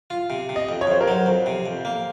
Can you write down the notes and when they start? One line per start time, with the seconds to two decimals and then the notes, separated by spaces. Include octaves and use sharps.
0.10 F4
0.30 C3
0.49 C3
0.56 D#5
0.69 F2
0.81 C#5
0.87 F2 C5
1.01 A#4
1.08 F#3 C5
1.26 F2
1.46 C3
1.66 F2
1.85 A#3